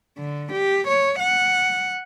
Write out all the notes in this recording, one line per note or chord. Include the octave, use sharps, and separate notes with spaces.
D3
G4
C#5
F#5